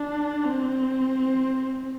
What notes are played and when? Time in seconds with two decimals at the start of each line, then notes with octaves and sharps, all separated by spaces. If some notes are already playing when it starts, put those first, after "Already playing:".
Already playing: D4
0.44 C4